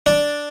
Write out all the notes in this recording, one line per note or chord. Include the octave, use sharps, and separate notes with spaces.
D4